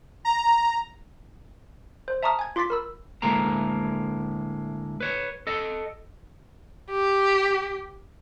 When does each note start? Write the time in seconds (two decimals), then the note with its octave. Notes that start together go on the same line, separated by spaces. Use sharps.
0.25 A#5
2.08 C5
2.23 E5 A5 A#5 C#6 D#6 F6
2.39 G#5 G#6
2.56 F4 C6 D6 A6 B6
2.70 A#4 B5 E6
3.22 D2 A2 G#3 A#3 A#5
5.00 B4 C#5
5.47 A4 D#5
6.90 G4